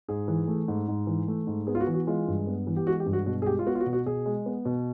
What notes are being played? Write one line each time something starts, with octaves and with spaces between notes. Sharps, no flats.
G#2 G#4
E3
A3
G#2
G#2
E3
A3
G#2
B3 G#4
F4
F#4
E3
F#4
G#3 F4
G2
B3
E3
G4
G#3 F#4
G4
G2
F#4
B2 F#4
G#4
G#3 G4
F4
B3 F#4
F4
F#4
B2
F#4
B2 G#4
G#3
B3
B2